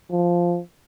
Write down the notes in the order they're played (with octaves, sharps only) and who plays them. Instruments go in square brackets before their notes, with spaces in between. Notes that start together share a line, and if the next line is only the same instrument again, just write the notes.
[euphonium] F3